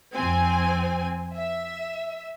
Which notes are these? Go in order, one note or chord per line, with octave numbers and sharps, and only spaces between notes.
F2 C4 G#5
E5